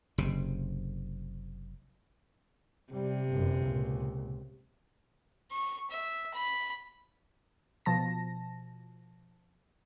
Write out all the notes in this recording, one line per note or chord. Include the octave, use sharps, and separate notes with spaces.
F#1 C3
C3 G3
G1 F#2
C#2 A#2
C#6
E5
B5
B2 F3 A5 A#6